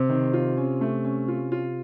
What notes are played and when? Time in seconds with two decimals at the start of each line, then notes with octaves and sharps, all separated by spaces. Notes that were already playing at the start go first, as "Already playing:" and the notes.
Already playing: C3 C4
0.09 D#3
0.33 F4
0.57 C#4
0.81 A3
1.05 C#4
1.28 F4
1.52 F4